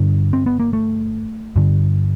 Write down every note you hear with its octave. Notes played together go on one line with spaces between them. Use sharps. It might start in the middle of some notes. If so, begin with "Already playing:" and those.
Already playing: G2 D3
C4
B3
A#3
A3
G2 D3